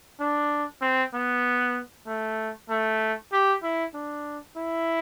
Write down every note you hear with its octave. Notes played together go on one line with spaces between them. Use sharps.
D4
C4
B3
A3
A3
G4
E4
D4
E4